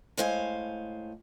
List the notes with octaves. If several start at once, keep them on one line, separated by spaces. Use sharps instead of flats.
A2 G#3 C5 F5 G#5